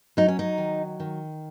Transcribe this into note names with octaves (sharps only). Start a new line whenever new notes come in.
F#3 D#4
C#4
D#4
D#3
D#3